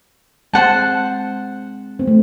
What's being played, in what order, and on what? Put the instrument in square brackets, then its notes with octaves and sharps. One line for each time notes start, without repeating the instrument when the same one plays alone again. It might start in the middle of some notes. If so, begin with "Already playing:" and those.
[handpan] G#3 C4 [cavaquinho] C5 F#5 A5
[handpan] C4
A3